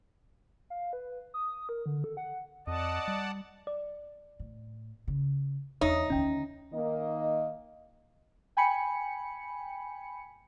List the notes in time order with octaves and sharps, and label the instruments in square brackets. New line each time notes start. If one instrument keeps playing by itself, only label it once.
[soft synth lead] F5
B4
D#6
A#4
D3
A4
F#5
[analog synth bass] F2 [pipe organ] D5 F#5 A5 [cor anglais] D#5
[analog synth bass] G3
[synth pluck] D5
[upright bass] A2
C#3
[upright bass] E2 F4 [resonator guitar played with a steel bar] D#4 [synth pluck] C#5 E5 D#6
[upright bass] D2 D#3 [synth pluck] C#4 G5
[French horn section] D#3 A#3 D#5
[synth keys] G5 G#5 B5 C#7